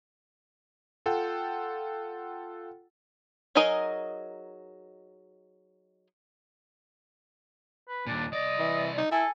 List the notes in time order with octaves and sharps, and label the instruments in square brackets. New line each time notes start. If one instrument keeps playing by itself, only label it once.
[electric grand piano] F4 A4 F#5 G5
[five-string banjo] F#3 D#4 G#4 A#4 D#5
[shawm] B4
[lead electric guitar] D#2 A#2 [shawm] D4
[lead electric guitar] C2 D5 [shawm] D#5
[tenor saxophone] E3
D#4
[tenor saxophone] E4 [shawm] A4 [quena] G#5